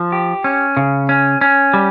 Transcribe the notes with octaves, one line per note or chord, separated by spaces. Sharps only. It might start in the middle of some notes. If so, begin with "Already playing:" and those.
Already playing: F3
G4
C#4
C#3
C#4
C#4
G3